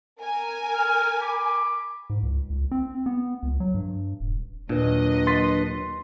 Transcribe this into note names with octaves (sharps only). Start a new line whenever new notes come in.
A#4 G#5
F6
B5 D6
G#2
C#2
C#2
C4
B3
C#2
F#3
G2
D#1
D#2 A#2 F#3 D4 B4 D#5
C6 A6 B6